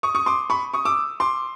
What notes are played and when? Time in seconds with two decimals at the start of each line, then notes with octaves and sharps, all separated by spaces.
0.03 C#6 D#6
0.15 C#6 D#6
0.26 C6 D6
0.50 B5 C#6
0.74 C#6 D#6
0.85 D6 E6
1.20 C6 D6